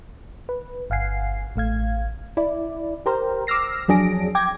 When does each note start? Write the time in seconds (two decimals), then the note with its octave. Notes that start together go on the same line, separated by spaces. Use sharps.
0.49 B4
0.90 G1 F5 F#5 G#5 C7
1.56 A1 A3 F5 G#6
2.37 E4 D5
3.06 G4 A#4 C5
3.47 D6 E6 F6 A#6 C7
3.88 F2 F#3 D4 G#4 A#6 D7
4.35 G5 D6 G#6 A#6